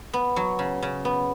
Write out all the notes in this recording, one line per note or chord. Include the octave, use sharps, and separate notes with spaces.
B3
F#3
C#3
C#3
B3